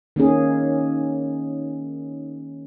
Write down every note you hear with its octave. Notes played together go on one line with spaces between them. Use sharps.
D#3 A#3 C#4 G#4